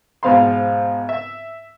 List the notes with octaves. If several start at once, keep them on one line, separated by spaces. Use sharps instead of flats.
G#2 B2 F3 F5 B5 C6
E5